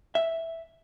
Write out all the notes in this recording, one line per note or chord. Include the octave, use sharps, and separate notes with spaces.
E5